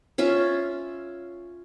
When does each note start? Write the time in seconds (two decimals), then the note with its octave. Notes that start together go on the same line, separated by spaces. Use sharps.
0.18 C#4 F4 E5